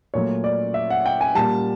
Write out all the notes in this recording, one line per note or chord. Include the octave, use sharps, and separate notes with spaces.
A#2 F#3 A3 C#5
D5
E5
F#5
G5
G#5
A#2 G3 A5